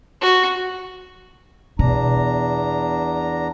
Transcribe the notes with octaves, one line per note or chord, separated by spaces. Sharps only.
F#4
E2 B2 D4 A#5